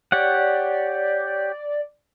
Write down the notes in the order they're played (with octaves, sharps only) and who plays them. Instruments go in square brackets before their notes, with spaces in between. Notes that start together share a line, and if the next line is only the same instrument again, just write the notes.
[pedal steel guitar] G4 C#5 F#5 [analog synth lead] D5